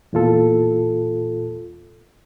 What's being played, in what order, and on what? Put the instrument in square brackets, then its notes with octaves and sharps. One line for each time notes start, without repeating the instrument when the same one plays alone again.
[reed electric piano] E2 A#2 F4 A4